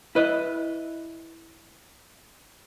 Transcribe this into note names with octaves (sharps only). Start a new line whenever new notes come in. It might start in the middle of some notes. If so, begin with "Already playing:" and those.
E4 B4 D#5